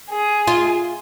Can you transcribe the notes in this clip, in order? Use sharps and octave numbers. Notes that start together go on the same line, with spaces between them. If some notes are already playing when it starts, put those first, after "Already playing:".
G#4
F4